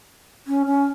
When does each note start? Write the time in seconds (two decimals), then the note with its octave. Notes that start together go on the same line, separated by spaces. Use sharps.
0.47 C#4
0.66 C#4